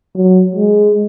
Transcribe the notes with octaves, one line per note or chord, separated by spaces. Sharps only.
F#3
G#3